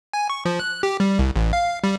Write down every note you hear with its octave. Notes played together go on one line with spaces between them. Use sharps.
G#5
C#6
F3
F#6
G4
G3
C2
A1
F5
G3